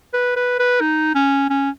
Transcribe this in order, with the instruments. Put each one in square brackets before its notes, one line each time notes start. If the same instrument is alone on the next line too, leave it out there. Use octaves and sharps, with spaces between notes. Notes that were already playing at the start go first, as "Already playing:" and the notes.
[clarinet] B4
B4
B4
D#4
C#4
C#4